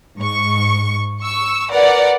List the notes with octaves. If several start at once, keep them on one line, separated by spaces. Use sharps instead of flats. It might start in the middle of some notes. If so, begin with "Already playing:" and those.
G#2 C#6
C#6 E6
A#4 B4 D5 F#5